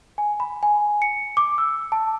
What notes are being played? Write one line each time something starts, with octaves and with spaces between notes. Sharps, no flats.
G#5
B5
G#5
C#7
D6
E6
A5